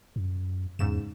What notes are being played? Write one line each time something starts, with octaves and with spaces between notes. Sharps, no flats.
F#2
E2 G#2 C#3 E7